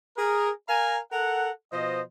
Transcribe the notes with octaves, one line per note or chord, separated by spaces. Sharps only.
G#4 A#4
A#4 F5 G#5 A#5
A4 A#4 F#5
B2 F3 C5 D#5